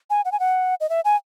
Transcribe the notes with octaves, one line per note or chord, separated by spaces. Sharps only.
G#5
F#5
G#5
F#5
D#5
E5
G#5